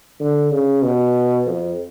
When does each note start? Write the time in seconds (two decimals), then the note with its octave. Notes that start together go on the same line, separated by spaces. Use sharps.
0.20 D3
0.51 C#3
0.83 B2
1.46 F2